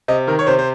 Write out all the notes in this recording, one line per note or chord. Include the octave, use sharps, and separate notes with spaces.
C3 D#5
D#3 A#4
C#5
C3 C5
C5